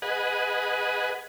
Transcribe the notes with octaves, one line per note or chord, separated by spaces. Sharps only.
G#4 B4 D#5 F#5